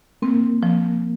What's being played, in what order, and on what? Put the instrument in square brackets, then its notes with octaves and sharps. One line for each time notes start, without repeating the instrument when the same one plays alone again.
[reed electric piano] A#3 [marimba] C4
[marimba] F3